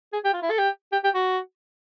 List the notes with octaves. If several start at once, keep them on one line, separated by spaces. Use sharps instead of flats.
G#4
G4
F4
E4
A4
G4
G4
G4
F#4